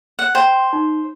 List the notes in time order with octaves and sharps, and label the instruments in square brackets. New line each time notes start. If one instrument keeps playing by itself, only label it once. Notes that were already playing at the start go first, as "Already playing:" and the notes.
[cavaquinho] F#5
[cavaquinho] C5 [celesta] G5
[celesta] D#4